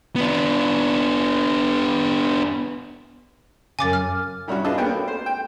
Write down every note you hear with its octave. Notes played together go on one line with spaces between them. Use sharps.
B3 D4
F#2 C#3 G#5 D6 A6
F6
C2 G2 C#4 F#4
D4 F4 G#4 B4 D#5 A5
A#3 B3 C#4 F#4 G5
A3
C5
G5